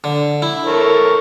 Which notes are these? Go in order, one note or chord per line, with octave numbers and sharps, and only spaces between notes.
D3
E4
A4 A#4 C#5